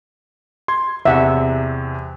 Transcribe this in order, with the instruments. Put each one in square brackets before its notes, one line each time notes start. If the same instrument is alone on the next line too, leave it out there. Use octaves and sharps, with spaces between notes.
[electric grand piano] C6 G#6
[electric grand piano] E2 C3 [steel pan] E5 F#5